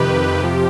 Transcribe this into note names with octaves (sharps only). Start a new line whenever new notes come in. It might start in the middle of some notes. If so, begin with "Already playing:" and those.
Already playing: F2 C3 D#3 G4 B4
F2 C3 F3